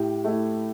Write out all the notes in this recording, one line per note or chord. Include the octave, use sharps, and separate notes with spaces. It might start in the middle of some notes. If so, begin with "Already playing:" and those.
Already playing: A2 G4
A3 E4